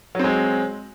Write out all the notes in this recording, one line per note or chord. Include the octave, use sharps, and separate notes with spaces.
F#3 G#3 C4